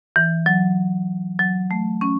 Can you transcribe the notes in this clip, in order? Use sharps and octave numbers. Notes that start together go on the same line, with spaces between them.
E3
F#3
F#3
A3
C#4